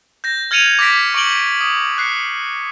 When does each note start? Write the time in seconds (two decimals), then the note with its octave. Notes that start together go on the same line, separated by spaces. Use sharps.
0.24 G6 A#6
0.51 F6 G#6 A6 C#7 D#7 F7
0.79 D6 A#6 B6 D7
1.14 C#6 D6 D7 F#7 G7
1.61 D#6
1.98 F#6 C7 C#7